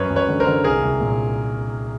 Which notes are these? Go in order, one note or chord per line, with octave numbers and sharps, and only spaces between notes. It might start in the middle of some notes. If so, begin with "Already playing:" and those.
Already playing: F#2 B4 C#5
F#2
B4 C#5
D3
A#4 C5
D3
C2 G#4 A#4
C2
A#2